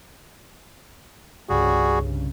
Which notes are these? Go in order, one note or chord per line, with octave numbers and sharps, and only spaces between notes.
C2 G2 C#3 G3 F#4 G#4